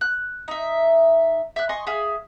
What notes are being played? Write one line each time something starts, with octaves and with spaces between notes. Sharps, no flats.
F#6
D#4 E5
E5 F#6
D#5 G#5 C6 C#6
G#4 E5 F5